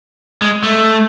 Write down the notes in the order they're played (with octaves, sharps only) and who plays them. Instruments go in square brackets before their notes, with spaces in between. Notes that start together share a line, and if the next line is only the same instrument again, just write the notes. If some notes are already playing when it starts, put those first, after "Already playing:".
[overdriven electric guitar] G#3
A3